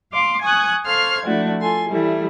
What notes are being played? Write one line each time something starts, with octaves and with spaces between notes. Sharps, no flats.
F5 C6 D6
G#5 C#6 D#6 F#6 G#6
A4 C5 F5 C#6 F6 G#6
F3 A3 D4 E4 F#4
F4 A4 G#5 C6
E3 G3 A3 E4